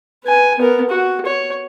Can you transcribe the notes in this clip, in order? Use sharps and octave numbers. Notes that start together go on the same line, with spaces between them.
B4 G#5
B3 A#4
F#4
C#5